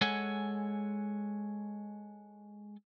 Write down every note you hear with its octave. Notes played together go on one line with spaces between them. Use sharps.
G#3 A4 C#5 F#5 G#5